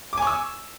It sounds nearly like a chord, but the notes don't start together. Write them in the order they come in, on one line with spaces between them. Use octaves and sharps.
D6 G#5 C#6 E6